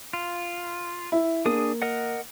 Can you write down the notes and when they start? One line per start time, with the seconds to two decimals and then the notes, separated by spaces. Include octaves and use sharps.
0.13 F4
1.12 E4
1.46 A#3 D4 G#4 D#6
1.82 A#4 D#5 F#5